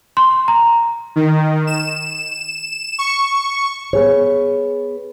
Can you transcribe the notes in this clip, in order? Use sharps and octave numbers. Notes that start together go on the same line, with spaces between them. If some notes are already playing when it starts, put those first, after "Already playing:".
C6
A#5
D#3
E7
C#6
B3 G#4 C#5